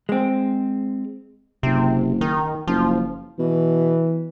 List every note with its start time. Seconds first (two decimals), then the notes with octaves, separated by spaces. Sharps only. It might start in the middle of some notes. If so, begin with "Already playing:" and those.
0.09 G#3 C4
1.63 F#1 C3
2.21 D#3
2.67 F#1 F3
3.39 B2 E3